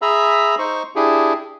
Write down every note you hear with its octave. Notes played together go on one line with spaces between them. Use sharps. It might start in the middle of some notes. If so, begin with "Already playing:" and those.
G#4 E5 A#5 B5 E6
D#4 C5 C#6
D4 E4 G4 G#4